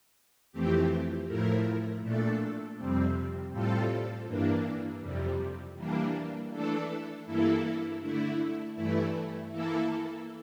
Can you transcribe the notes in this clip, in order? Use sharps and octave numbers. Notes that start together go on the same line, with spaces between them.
F2 E3 A3 C4 G4
A2 F3 A3 E4 A#4
A#2 A3 D4 A4
F2 C3 G3 C4
A2 G3 C4 F4 A4
G2 E3 A#3 D4
F2 C3 G3
E3 G3 A#3 D4
E3 A3 D4 A4
G2 E3 A#3 E4 A4
D3 A3 E4
G2 E3 A3 E4
E3 A#3 E4 A4